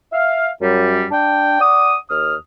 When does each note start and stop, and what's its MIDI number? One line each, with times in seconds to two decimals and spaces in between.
0.12 0.50 76
0.12 0.50 77
0.61 1.04 42
0.61 1.04 55
1.11 1.56 62
1.11 1.56 79
1.60 1.95 74
1.60 1.95 78
1.60 1.95 87
2.09 2.34 39
2.09 2.34 87
2.09 2.34 89